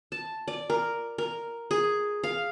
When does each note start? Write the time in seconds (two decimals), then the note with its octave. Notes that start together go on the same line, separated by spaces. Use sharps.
0.12 A5
0.48 D5
0.70 A#4
1.18 A#4
1.71 G#4
2.24 F5